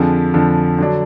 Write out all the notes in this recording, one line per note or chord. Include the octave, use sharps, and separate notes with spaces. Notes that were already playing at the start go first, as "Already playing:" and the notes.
Already playing: F2 D3 F3 G#4
F2 D3 F3
D3 F#3 D4